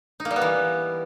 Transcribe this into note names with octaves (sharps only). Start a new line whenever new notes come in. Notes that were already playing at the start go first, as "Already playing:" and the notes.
D#4
A#3
G3
B3
E3